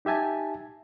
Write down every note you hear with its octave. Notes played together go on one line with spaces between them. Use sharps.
D#4 G4 E5 G#5 A5